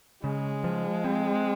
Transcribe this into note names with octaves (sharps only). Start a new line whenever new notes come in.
C#3 G#3
F3
C4